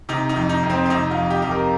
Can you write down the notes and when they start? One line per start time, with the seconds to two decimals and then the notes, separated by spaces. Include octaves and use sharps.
0.09 C3 D#4
0.29 D#4
0.36 F2
0.49 D#4
0.63 F2
0.70 C4
0.86 C4
0.90 C3 D#4
1.11 F4
1.17 F2
1.30 G4
1.42 F2 G4
1.51 A#4